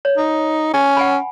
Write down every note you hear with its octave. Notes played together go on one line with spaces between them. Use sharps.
C#5
D#4
C#4
F#5 G#5 B5